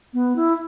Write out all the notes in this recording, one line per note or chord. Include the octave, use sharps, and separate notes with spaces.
B3
E4